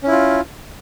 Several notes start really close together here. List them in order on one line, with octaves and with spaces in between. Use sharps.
C#4 E4 F4